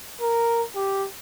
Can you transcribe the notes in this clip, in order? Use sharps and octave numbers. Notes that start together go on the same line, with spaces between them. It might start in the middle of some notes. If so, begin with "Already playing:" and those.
A#4
G4